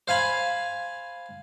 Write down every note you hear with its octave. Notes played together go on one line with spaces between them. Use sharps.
C5 F5 G#5 B5